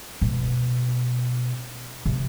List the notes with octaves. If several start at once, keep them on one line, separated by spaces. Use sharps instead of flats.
B2
C3